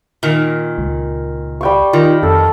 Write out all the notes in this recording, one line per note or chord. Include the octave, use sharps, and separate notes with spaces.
A#2 D#3
C#2
G3 G5 C#6
D#3 F4
F2 A4